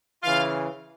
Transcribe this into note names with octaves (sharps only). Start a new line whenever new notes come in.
C#3 E3 F4 F5